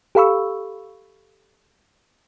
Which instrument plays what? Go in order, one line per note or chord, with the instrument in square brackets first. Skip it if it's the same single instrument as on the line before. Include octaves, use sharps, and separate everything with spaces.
[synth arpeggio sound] G4 A4 F5 B5 C#6 E6